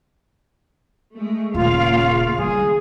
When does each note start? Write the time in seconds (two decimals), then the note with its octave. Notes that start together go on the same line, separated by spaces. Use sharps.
1.14 G#3 A3
1.54 D#1 C#3 A#3 F4 F5
2.38 D#3 G3 G#4